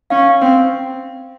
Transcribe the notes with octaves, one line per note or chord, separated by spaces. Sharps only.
C#4 F5
C4